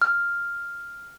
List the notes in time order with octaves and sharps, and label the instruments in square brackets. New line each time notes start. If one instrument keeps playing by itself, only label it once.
[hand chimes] F6